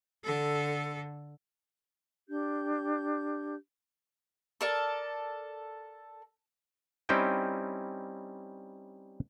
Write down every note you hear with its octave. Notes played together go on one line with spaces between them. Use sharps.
D3 A4
D4 G4 G6
A4 A#4 D5
G3 C4 C#4 D#4 E4 G5